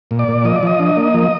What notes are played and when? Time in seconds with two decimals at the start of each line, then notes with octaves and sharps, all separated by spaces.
0.11 A#2
0.19 D5
0.28 A#2
0.45 F3 D#5
0.56 D5
0.63 F3 D#5
0.80 D4
0.97 A#3
1.14 F3